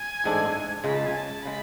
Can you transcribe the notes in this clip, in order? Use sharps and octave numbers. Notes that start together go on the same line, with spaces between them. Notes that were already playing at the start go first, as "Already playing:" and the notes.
Already playing: G#5
A1 G#2 G#3 D4 A4
C#2 C#3 G#3 B5
A5
G#5
A5
C#3 G#3 B5